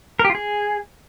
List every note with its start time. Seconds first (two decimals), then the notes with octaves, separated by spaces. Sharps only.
0.19 A#4
0.25 G4
0.30 F4
0.35 G#4